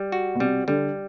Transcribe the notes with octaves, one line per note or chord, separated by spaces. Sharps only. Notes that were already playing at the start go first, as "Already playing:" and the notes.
Already playing: G3
F#4
B2
C3 G3
D3 G3